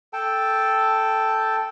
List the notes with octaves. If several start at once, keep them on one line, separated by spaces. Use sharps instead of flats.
A4 G5 A5